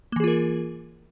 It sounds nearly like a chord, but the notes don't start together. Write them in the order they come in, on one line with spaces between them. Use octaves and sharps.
A#3 E3 G#4 F4 A#4